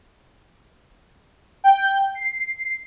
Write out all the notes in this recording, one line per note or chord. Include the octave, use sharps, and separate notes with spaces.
G5
C7